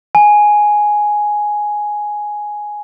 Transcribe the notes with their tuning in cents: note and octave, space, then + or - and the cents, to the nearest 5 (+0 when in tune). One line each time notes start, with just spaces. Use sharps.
G#5 +5